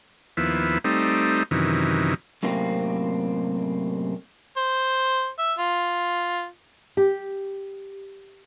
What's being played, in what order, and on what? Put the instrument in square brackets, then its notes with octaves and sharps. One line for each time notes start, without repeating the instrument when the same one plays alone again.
[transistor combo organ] D#2 F3 B3 E4
G3 A3 C4 D#4
F#2 C3 D#3 E3
[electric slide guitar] F#2 A2 C3 A#3 C4
[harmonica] C5
E5
F4
[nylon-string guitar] G4